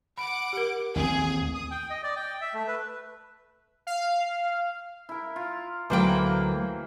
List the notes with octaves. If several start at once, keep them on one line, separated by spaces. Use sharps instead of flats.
F#5 B5 D6 D7
G4 A#4
A1 D#2 C4 G#4
D#6
G5
D#5
D5
G5
E5
A3
B4
F5
E4 A#4
F4
D2 E3 F#3 A#3 C5 G5